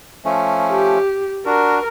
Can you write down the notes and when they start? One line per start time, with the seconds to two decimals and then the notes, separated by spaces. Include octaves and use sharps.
0.25 F3 A3 C#4
0.70 G4
1.46 D4 F#4 A#4